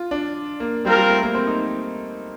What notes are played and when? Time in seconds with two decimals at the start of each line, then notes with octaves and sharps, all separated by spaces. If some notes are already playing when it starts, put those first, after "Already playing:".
Already playing: F4
0.11 D4
0.60 A#3
0.85 G3 C4 F4 A#4
0.97 G3
1.10 A3
1.23 A#3
1.34 C4
1.47 D#4